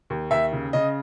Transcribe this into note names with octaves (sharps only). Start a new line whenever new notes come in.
D#2
D#2 E5
C#3
C#3 D#5